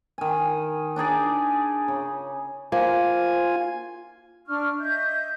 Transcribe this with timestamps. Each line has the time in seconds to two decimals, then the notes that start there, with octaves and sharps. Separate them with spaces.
0.18 D#3 G#5
0.96 D4 D#4 G#4 D5
1.88 C#3
2.72 A#3 F4 C5 G#5
4.47 D4 C#6 F6
4.79 D#5 E5 G6